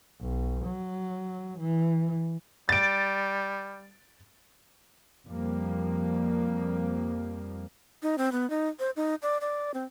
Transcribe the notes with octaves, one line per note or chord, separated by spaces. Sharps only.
B1
F#3
E3
G3 A6 D7
F2 F3 G3 A#3
D#4
C4
B3
D#4
C5
D#4
D5
D5
C4